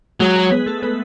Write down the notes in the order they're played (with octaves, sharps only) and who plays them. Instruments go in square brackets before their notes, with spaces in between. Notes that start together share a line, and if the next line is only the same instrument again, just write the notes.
[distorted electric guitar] F#3 [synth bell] G#3 G#4
[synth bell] G#3 G#4
B3 B4
A3 A4
B3 B4